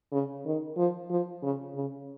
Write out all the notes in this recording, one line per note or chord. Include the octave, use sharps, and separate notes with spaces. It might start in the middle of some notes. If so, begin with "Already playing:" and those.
C#3
D#3
F3
F3
C#3
C#3